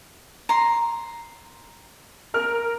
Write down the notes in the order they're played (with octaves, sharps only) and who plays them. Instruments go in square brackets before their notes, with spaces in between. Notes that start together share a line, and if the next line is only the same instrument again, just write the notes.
[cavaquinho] A#5 C6
[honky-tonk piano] A#4 F6